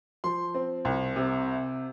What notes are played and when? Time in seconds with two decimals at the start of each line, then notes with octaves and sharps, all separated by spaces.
0.24 F3 C6
0.54 C4
0.85 C2
1.16 C3